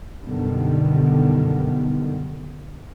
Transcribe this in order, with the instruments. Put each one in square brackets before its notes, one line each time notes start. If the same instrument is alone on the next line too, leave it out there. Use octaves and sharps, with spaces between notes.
[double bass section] F#2 B2 D3 D#3 G3 B3